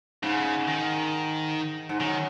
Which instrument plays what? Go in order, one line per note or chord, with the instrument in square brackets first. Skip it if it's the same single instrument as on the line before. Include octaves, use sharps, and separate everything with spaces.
[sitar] G#2 [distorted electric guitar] C#3
[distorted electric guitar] D#3
[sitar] G#2
[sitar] F#2 [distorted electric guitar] D#3